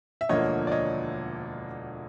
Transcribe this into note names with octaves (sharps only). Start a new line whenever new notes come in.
E5
E1 D2 D3 F3 A#3 C#5 D#5
D5
C#5 D#5